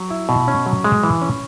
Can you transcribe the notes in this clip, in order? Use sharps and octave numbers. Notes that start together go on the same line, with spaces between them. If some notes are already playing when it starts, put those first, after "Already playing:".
Already playing: F#3
E4
B2
C#4
F#3
G#3
E3
C#4